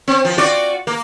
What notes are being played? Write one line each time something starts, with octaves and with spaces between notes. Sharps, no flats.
C4
F3
F4 F#4 D5
A#3